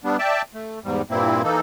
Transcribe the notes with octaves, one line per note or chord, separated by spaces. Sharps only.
G3 B3 D4
D5 E5 G5 A5
A3
E2 G#2 G3
G2 A#2 A#3 C4 E4
E3 A#3 D#4 A4